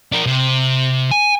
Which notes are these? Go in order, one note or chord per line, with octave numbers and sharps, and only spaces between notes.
D4 A#4
C3
G#5